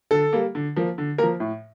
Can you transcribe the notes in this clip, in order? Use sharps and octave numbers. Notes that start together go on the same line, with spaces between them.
D3 A4
G3 A#3
D3
F3 A#3
D3
F3 A#3 A#4
A2